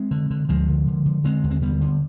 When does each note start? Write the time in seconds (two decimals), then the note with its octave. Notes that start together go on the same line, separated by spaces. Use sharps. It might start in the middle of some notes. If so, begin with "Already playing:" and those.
Already playing: G#3 C4
0.11 D3
0.30 D3
0.49 D2 F3 G#3
0.68 D3
0.87 D3
1.06 D3
1.24 D3 G#3 C4
1.44 D#2
1.51 C4
1.62 D3 G3 B3
1.81 D3